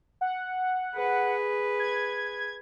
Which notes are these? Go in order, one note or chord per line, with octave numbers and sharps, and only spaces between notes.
F#5
G#4 B4
G#6